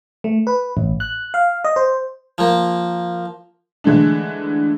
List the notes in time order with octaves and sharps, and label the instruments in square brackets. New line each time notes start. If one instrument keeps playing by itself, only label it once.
[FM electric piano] A3
B4
A1
F#6
F5
D#5
C5
[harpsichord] F3 A#3
[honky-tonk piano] D3 E3 G#3 A3 D4